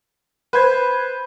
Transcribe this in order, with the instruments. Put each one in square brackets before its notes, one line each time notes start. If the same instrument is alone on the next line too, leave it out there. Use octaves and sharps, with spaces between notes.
[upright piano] B4 C5 G#6